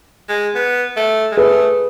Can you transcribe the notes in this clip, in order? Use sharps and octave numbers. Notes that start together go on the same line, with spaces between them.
G#3
B3
A3
G#3
A3 G#4 B4